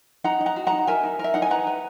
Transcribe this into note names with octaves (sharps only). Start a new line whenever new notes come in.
D#4 F#5 A#5
D#4
F#5 A#5
F#4
F#5 A#5
D#4
A#4 E5 G#5
D#4
A#4
E5
D#4 F#5
G#5
B4 F#5 A#5
B4